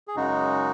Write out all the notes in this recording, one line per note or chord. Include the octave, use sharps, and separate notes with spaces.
G#4
F#2 C#3 G#3 D#4 F#4